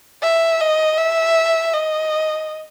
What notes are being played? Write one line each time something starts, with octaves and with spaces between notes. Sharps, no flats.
E5
D#5
E5
D#5